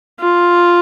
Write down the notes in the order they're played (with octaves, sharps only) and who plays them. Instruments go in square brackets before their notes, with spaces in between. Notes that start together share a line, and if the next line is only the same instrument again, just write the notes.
[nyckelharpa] F4